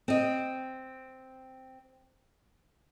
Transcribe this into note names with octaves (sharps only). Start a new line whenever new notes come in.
C4 D#5